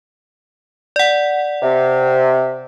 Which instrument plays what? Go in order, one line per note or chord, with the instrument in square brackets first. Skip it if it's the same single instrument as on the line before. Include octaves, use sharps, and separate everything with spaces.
[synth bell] D5 F#5
[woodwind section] C3